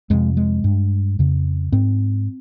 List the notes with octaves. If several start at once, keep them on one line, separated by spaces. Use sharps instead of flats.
F2 C3 G#3
G#3
G2
F2 C#3
G#2 C4